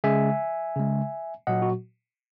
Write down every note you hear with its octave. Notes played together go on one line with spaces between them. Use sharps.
C#3 G#3 E5 G#5
C#3 G#3
A#2 F#3 D#5 F#5
F#4